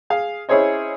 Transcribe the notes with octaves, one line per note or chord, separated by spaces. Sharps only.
G#4 F5
C#4 E4 G#4 C5 C#5 D#5